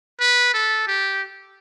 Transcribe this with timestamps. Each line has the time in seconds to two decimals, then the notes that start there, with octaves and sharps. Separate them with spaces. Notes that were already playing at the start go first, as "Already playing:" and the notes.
0.21 B4
0.54 A4
0.87 G4